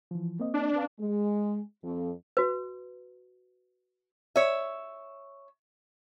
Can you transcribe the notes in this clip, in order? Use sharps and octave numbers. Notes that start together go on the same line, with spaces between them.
E3 F3
A#3 C4 D#5
D4
C4 B4 F5
G#3
F2
F#4 B4
C#5 E5